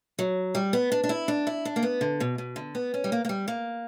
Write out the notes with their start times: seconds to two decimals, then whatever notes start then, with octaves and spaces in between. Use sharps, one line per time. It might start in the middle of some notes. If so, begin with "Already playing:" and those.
0.19 F#3
0.55 G3
0.73 B3
0.92 D4
1.04 D4
1.09 E4
1.28 D4
1.47 E4
1.65 D4
1.76 A#3
1.83 B3
2.01 D3
2.20 B2
2.38 B2
2.56 D3
2.75 B3
2.94 C#4
3.04 G3
3.12 A#3
3.25 A#3
3.29 G3
3.48 A#3